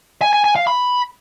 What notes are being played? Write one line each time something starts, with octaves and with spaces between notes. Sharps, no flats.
G#5
G#5
G#5
F5
B5